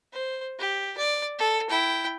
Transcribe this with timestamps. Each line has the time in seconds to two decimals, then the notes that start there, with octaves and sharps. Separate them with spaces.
0.13 C5
0.59 G4
0.98 D5
1.39 A4
1.69 E4 G5